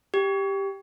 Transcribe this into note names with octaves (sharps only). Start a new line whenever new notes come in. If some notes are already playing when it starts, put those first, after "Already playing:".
G4